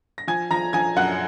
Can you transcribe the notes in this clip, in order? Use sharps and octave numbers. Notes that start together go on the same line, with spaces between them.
A#6
F3 G#5 G#6
F3 A#5 A#6
F3 G#5 G#6
F#2 F#5 F#6